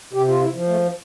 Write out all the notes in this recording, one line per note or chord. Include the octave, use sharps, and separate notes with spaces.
C3 G4
F4
E4
F3
A3